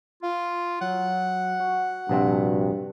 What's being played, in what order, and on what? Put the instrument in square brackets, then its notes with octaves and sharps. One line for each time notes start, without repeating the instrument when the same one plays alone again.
[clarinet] F4 [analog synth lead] F5
[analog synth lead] F#3 [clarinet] F#5
[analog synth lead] F#4
[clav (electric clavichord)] A#1 C3 C4 [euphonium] G2